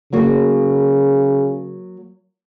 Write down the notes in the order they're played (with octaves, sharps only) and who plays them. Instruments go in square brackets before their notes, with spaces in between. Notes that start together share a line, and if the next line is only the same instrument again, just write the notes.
[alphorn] C#3 [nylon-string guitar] F#3 A#3 F#4